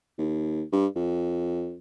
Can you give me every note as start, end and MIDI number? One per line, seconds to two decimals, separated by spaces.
0.18 0.63 39
0.72 0.86 43
0.96 1.77 41